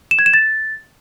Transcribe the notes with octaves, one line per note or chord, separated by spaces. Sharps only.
E7
G#6
E7
A6